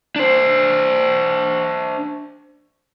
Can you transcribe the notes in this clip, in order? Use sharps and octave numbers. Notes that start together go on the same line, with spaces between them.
D4 C5